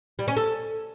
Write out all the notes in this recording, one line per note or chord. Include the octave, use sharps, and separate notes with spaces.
G3
C#4
A4